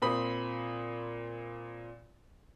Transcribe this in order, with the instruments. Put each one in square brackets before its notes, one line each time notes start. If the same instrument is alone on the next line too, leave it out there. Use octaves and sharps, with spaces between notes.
[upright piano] A#2 C4 B5 D#6